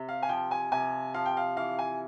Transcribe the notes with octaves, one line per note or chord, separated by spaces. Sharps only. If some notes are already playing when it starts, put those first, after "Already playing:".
Already playing: C3
F5
G#5
F3 G5
G#5
C3 G#5
F3 F5
G5
F5
E3 F5
G#5